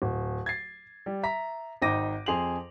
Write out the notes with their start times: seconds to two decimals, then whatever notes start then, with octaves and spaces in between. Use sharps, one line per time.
0.02 D1
0.46 G#6 A6 C7
1.06 G3
1.23 E5 A#5 B6
1.82 G#1 D#4 G5 D6 A#6 D#7
2.26 F2 G#4 C6 F7 F#7